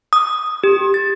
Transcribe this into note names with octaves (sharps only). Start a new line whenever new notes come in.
D#6
G4
A6